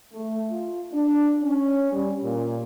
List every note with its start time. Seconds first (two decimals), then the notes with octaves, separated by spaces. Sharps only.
0.13 A3
0.50 F4
0.92 D4
1.43 C#4
1.92 G3
2.21 A#2